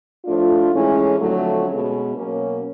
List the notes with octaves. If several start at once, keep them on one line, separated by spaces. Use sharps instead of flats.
A2 F3 A3 D4 F4
A2 E3 G#3 C#4 E4
F2 D3 F#3 A3
B2 G#3 C#4
B2 F#3 A#3 C#4